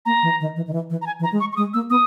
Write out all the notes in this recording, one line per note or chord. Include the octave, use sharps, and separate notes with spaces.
A#3 A#5
E3
D#3
E3
D#3
E3
E3
A#5
G#5
E3
A#5
G#3
C#6
C#6
G#3 D#6
A#3 E6
B3 D#6